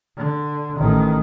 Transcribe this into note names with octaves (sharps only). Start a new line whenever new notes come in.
D3
A1 D#3